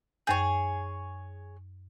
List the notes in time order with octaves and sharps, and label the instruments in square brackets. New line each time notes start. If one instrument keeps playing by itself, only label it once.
[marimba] F#2 G6 [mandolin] G#4 C#5